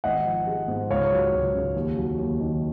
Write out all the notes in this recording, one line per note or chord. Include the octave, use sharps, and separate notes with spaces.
G#1 D#5 F#5
F3
G#3
G#2
C#2 C#5 F5
F#3
C#2
C#3
D#2
F#3
D#2
D#3